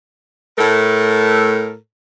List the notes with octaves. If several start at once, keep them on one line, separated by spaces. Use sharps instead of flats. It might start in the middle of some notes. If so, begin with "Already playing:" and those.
A2 A3 A4 A#4